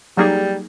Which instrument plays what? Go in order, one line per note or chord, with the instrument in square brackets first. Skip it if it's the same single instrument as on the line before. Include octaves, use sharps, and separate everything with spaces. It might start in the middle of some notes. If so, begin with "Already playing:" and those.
[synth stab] F#3 A#3 D#4 G#4 [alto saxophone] G3